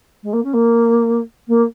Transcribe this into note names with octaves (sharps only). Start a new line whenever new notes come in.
G#3
A#3
C#4
A#3
A#3